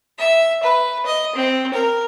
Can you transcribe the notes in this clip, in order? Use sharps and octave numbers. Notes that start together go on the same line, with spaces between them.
E5
B4
D#5
C4
A#4